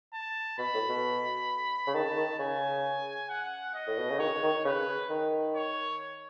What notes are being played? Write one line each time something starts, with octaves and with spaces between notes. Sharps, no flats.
A5
B2 B5
A2
B2
C#3
D#3 A5
D#3
C#3 G#5
F#5
D#5
A2
B2
C#3
D#3 C#5
D#3
C#3 B4
D#3
C#5